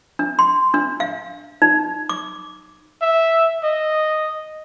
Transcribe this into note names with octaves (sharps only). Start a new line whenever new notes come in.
D4
C6
D4
F5
D#4
D6
E5
D#5